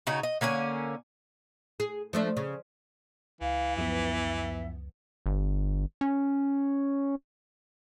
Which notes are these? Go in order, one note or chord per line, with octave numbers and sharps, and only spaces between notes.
C#3 C#4 D#4 F#4
D#5
D3 A#3 C#4 G#5
G#4
F3 A3 D4
C#3
C#2 E3 F5
F#2 F3 B3 E5
G1
C#4